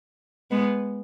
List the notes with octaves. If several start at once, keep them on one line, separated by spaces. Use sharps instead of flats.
G#3 B3